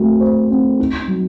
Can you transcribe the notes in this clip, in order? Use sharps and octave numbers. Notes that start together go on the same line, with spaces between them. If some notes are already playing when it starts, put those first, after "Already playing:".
Already playing: A3 C4 F#4
C5
C4
D#4
F#3